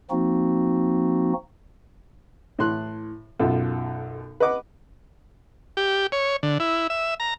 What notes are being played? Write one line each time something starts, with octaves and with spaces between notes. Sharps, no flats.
F3 A#3 C4 D#4 F#4
A2 E3 C6 F#6
B1 F#2 F4 A4
B4 D#5 F#5 D6
G4
C#5
D3
E4
E5
A#5